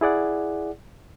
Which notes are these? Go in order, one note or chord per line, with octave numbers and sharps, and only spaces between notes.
E4 G#4 D5 F#5